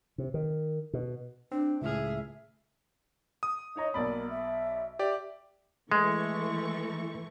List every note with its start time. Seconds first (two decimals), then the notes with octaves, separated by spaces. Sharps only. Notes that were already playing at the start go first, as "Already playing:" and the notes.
0.18 C3
0.34 D#3
0.93 B2
1.52 C4 D4
1.82 C#2 A2 G#4 E5 F6
3.43 D#6
3.76 D#4 C#5 D#5 A#5
3.94 B1 A#3 D5 B5
4.30 E5
4.99 G4 D5 E5
5.92 E3 G#3 A3 C#6